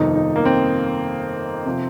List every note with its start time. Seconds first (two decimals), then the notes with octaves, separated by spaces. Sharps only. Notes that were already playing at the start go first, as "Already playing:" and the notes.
Already playing: G1 F2 C3 D#3 D#4
0.15 D#4
0.36 A#3
0.45 C4
1.66 C3 F3